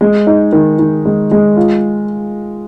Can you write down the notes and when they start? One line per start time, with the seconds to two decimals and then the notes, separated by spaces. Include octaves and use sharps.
0.01 G#3
0.27 D#4
0.52 D#3
0.79 D#3
1.05 G#3
1.31 G#3
1.56 F4